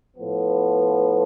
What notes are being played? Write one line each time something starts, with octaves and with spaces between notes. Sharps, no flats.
A2 F3 B3